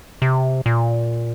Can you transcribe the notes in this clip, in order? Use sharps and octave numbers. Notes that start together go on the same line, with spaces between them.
C3
A#2